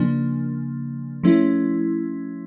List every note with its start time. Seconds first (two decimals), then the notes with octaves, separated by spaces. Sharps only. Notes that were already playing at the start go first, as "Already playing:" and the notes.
Already playing: C#3 F3 A#3 D4
1.23 F3 A3 C#4 E4